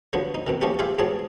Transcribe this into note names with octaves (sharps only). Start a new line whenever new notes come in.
D3 F3 F#3 B3
D#4
F2 B2 D#3
E3 F3 A3 B3 C#4 G4
F4 G4 G#4 C5 E5 F5
E2 G#2 F#3 G#4 A5